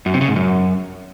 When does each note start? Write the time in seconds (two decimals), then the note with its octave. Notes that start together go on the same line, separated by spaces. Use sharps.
0.06 F#2
0.13 C3
0.21 C#3
0.28 G#2
0.36 F#2